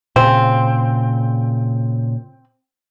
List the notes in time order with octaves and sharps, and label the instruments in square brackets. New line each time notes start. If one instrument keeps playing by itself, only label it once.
[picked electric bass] A#2 C#3 [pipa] C4